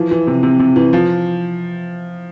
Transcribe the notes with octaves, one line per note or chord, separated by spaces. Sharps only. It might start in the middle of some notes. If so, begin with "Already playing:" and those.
Already playing: E3 F3
E3
C3
C3
C3
E3
F3